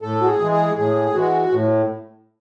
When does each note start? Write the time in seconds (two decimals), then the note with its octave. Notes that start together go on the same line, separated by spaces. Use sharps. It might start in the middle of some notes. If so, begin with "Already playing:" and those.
0.02 A2 A4
0.21 F#4
0.26 G#4
0.40 E3 G#3
0.52 G#4
0.77 A2 G#4
1.15 E3 G#3 F#4
1.52 A2